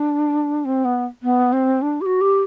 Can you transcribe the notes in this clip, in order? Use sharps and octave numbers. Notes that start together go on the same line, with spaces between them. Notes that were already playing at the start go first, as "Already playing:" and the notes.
Already playing: D4
C4
B3
B3
C4
D4
G4
F#4
G4